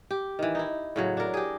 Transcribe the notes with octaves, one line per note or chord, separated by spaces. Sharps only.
G4
D#3 E3
D#4 E4
A2 C#3 F#3
D4 A#4
G4 G#4